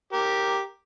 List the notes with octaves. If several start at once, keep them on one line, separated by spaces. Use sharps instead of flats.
G4 A#4